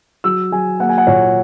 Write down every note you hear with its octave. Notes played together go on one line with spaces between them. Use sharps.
F#3 E6
F#3 G#5
A#3 F#5
G#5
F#5
A#2 C#5